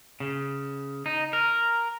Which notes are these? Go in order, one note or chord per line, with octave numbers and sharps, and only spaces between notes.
C#3
D#4
A#4